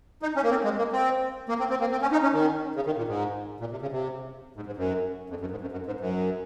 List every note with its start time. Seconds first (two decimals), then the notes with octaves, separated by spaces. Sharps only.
0.22 D#4
0.36 C#4
0.43 A#3
0.50 C4
0.64 G#3
0.78 A#3
0.92 C4
1.49 A#3
1.60 C4
1.70 C4
1.81 A#3
1.92 C4
2.02 C#4
2.12 D#4
2.23 C#4
2.34 D#3
2.76 C#3
2.86 D#3
2.97 A#2
3.08 G#2
3.60 A#2
3.71 C3
3.82 C#3
3.92 C3
4.56 G#2
4.66 G#2
4.77 F#2
5.30 F2
5.41 F#2
5.51 G#2
5.61 F#2
5.72 F#2
5.86 G#2
6.00 F#2